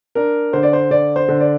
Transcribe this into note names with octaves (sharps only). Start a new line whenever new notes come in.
D4 A#4
D3 C5
D5
C5
D3 D5
C5
D3
D5